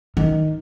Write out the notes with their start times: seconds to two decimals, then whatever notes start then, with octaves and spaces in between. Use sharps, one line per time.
0.17 D#3